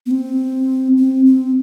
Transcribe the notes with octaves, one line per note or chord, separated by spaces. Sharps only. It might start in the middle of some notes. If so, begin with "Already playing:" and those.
B3
C4
C4
C4